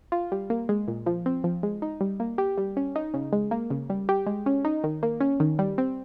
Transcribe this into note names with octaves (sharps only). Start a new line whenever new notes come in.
F4
G3
A#3
G#3
A#2
F3
C4
F3
G#3
D#4
G3
A#3
G4
G3
C#4
D#4
C#3
G#3
A#3
C#3
G3
G4
G#3
C#4
D#4
D#3
A#3
C#4
D#3
G3
C4